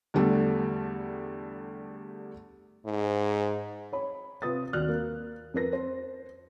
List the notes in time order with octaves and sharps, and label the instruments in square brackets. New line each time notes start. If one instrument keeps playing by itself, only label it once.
[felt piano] E2 D3 G3 A3
[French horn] G#2
[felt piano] C#5 B5
C3 F4 B4 D#6 A6
D#2 F#4 D5 F6 F#6
A#3
F2 A#4 B4 A#6
C5